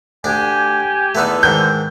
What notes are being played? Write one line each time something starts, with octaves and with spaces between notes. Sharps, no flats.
D2 D4 G4 G#5
E2 D3 A3 B3 D#4 E6
G#2 D#3 G6